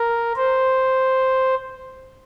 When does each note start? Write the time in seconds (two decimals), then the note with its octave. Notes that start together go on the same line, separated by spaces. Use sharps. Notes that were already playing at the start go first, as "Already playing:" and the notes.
Already playing: A#4
0.37 C5